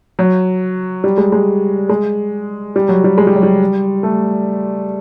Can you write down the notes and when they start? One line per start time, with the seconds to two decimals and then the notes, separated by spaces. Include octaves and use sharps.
0.19 F#3
1.04 G3
1.18 G#3
1.32 G#3
1.89 G#3
2.76 G3
2.89 F#3
3.04 G3
3.18 G#3
3.27 G3
3.35 F#3
3.43 G3
4.03 A3